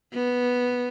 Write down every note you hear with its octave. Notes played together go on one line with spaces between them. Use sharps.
B3